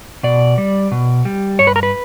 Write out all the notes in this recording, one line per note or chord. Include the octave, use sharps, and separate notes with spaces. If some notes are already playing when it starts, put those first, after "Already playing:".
B2 D5
G3
B2
G3
G2 C#5
B4
A#4
B4